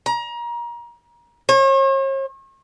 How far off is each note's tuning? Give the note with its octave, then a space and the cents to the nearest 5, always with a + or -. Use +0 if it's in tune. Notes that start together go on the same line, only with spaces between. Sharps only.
A#5 +30
C#5 -45